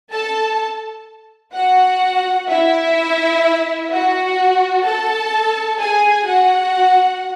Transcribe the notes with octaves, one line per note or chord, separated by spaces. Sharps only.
A4 A5
F#4 F#5
E4 E5
F#4 F#5
A4 A5
G#4 G#5
F#4 F#5